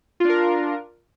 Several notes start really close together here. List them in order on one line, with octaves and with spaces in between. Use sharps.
F4 D4 A#4